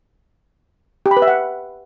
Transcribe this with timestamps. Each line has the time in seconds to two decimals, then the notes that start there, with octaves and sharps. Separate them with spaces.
1.06 G4
1.11 B5
1.17 B4
1.22 E5
1.28 F#5